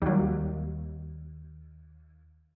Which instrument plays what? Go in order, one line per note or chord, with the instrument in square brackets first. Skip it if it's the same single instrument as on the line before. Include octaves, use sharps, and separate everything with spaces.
[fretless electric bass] D#2 [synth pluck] F#3 G3